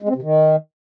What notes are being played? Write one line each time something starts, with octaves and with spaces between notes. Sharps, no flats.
G#3
C4
C3
D#3